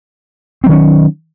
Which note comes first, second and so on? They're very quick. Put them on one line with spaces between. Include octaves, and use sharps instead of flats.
C4 F#3 D#3 C#4